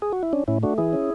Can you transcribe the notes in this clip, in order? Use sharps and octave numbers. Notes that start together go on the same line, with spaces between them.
G#4
F#4
E4
C#4 D4
A2 C#4 E4
A3 D4 F#4
E3 E4 G#4
C#4